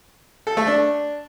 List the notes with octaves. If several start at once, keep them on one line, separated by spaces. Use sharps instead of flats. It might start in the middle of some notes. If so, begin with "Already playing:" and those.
A4
A3
D4